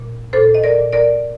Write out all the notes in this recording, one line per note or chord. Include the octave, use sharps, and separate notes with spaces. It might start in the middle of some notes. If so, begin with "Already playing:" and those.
Already playing: A#2
A#2 A4 C5
D#5
A#4 D5
A#2
A#4 D5